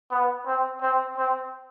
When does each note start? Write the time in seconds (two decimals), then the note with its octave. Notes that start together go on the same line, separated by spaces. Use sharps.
0.11 B3
0.46 C4
0.81 C4
1.17 C4